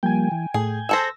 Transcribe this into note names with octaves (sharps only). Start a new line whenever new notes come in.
F3 G3 A#3 G5 G#5
E3
A2 G#4 G5 G#5
G#4 A4 C5 E6 A#6